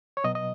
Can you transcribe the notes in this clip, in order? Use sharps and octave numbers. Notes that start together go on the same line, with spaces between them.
C#5
B2 F#3 D#5
D#5